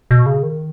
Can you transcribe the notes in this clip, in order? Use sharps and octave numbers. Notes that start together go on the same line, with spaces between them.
B2
C#3
D#3